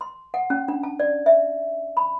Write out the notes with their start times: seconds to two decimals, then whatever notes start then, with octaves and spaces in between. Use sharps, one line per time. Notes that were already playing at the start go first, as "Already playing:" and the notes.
0.01 C6
0.34 F#5
0.50 C#4
0.68 D4
0.83 A5
1.00 D5
1.26 E5
1.97 B5